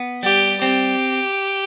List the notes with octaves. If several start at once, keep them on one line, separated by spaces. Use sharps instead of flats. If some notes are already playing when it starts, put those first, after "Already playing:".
Already playing: B3
G3 G4
C4 G4